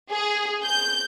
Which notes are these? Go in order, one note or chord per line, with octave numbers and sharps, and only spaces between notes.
G#4
G6